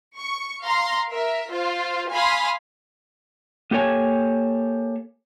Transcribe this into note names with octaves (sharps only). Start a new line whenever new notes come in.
C#6
F5 A#5 C6
A#4 E5
F4 C5
F5 G#5 B5 C6 D#6
A#3 G4 A4 C#5 G#5